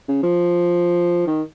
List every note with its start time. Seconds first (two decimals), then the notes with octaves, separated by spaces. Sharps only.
0.08 C#3
0.23 F3
1.27 D#3